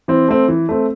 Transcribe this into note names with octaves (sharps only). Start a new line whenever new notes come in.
E3 C4
A3 C4
E3
A3 C4